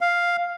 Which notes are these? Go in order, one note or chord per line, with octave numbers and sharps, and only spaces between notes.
F5